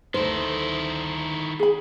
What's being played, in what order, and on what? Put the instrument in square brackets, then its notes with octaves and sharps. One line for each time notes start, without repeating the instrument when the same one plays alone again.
[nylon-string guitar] D2 C5 [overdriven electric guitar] D#3 E4
[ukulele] G#4 B5